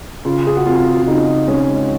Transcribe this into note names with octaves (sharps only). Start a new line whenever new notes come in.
C#3 F4
G#4
F#4
C4 F4
F4
C#3 D#4
G#3 C#4